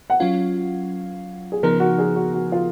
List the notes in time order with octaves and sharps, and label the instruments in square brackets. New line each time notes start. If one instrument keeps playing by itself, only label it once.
[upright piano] F#5
[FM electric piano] F#3 C#4 F4 [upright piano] F5
[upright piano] G#4
[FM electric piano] C#3 F3 B3 D#4 [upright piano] A#4
[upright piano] F#4
G#4
F#4
F#4
F4